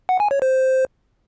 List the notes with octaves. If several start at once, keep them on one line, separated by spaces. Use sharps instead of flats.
F#5
G#5
C#5
C5